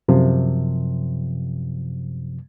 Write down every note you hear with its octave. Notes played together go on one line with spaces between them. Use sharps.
F#2 C3 F3